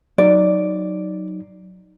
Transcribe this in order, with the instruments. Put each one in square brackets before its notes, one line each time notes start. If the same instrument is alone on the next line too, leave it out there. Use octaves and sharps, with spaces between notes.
[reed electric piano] F#3 D#4 [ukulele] D5